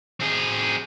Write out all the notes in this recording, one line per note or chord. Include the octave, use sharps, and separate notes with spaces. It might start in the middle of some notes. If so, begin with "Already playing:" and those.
C4 G#4